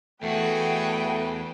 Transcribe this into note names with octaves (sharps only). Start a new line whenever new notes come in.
E2 A3 F#4 G#4 B4 G5